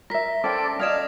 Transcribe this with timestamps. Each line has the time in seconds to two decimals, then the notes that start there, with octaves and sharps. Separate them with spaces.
0.10 A#4 E5 A#6 B6
0.44 C#4 A4 C5 D5 G5
0.80 C#4 D5 D#5 F5 D#6 G#6 E7